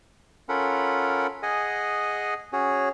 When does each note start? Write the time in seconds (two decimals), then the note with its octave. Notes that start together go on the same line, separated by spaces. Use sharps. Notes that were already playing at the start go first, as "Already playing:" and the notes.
0.49 C#4 F4 A4 A#4 F#5 B5
1.43 G#4 D#5 F#5 G#5
2.53 C#4 F#4 G#4 C#5